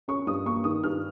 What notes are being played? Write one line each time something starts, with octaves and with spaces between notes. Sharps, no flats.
C#4 C#6
G2 D#6
A#3 C#6
D#3 D#6
G2 F6